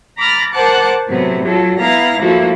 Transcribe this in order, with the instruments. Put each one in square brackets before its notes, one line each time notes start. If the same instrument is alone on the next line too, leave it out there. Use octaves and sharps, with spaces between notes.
[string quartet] A#5 B5 D6 F6 A6 A#6
A#4 C5 F#5 A5 D6 F#6
A2 C3 F#3 B3
F#3 F4 A4
B3 E4 F5 A#5 A#6
F3 A3 A#3 E4 F#4